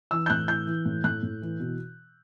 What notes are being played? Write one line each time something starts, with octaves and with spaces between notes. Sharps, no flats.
E3 E6
G6
A2 F#6
E3 G6
E3
A2
A2 F#6
A2
E3
B2